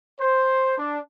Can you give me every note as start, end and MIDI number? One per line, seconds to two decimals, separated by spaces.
0.19 0.78 72
0.78 0.99 62